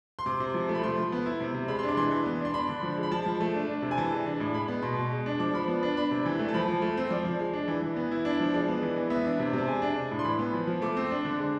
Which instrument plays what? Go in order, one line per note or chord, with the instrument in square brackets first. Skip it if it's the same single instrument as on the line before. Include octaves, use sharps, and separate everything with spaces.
[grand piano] C6
C3 D6
C3
F3
A3
B5
F3 C6
F3
B3
E4
C3
C3
G#3 B5
C6
D4 D6
E3 C6
E3
B3
D4
C6
D4 B5
D3
F3
G#3
B5
F3 A5
F3
A3
D4
D4
C3
G#5
E3 A5
G#3
D4
A2
G#3 B5
B3
B2 C6
B2
G#3
D4
F3 D6
F3 B5
B3
D4
D4 B5
C3
E3
A3
A5
F3 B5
F3
A3
C4
F3 D5
F3
G#3
D4
E3
E3
B3
E4
D4
F3
G#3 D5
B3
E3
E3
B3 E5
D4
C3
C3 A5
G#3 G#5
D4
D4
A2
C6
E3 B5
B3
F3
F3
A3 D6
C4
D4
D3
G#3